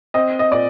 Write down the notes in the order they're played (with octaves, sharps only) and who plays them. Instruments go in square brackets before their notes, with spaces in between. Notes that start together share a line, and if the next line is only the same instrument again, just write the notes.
[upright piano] C4 D#5
D#5
A#2 D5